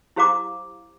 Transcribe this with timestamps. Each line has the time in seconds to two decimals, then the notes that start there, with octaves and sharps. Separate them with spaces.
0.16 E4 G4 C5 F5 A#5 D6